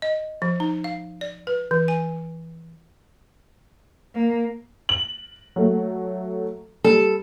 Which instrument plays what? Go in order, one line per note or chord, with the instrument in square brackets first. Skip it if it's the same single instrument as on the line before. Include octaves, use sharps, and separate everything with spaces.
[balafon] D#5
F3
D#4
F5
D5
B4
E3
G#5
[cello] A#3
[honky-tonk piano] F#7
F#3 A3
[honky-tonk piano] G3 [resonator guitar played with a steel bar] A4